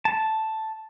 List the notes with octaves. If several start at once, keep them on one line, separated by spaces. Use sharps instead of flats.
A5